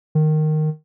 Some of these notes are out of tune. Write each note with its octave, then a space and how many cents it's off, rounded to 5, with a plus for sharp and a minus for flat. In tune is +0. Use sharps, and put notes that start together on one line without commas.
D#3 -10